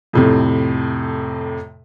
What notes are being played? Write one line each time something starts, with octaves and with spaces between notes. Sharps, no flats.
F2 A2 C3